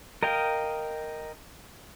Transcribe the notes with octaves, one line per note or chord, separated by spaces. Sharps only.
A#4 D#5 F5 G5